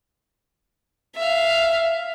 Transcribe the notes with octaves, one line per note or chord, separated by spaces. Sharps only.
E5 F5